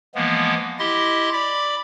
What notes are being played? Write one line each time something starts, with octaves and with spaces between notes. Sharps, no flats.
E3 F3 G#3 A#3 B3
E4 G4 D#5 C6
D5 B5 D6